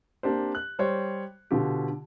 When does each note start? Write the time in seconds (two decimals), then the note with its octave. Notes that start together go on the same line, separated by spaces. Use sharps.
0.23 A#3 C4 D4 G4 C5
0.55 F#6
0.79 G3 C5 C#5
1.51 B2 D3 F4 G4